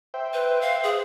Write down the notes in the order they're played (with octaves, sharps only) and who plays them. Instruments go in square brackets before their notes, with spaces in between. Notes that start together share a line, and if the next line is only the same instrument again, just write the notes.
[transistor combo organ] C5 E5 G5
[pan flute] B4
F5
G#4